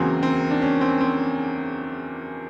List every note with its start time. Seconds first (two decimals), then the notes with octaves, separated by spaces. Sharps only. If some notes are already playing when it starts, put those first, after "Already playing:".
Already playing: E2 C#3 F#3 A#3 C4
0.23 C4
0.51 D4
0.62 C#4
0.81 C4
1.01 C4